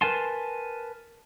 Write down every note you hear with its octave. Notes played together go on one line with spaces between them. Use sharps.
A#4 B4 G#5 A5 C6